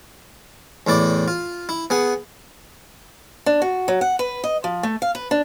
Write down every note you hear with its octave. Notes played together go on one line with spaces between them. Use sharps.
E2 A2 E4 D5
F4
E4
B3 G#4 F#5
D4
F#4
F#3
F#5
B4
D#5
F3
A3
F5
B4
D4